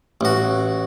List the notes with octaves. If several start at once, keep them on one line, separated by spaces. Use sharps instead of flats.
A1 F#4